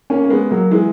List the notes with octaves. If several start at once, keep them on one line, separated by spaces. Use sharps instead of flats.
A#3 C#4
A#3
G#3 B3
F#3 A#3
E3 G#3